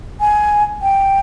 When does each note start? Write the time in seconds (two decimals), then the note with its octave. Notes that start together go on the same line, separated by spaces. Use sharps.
0.20 G#5
0.82 G5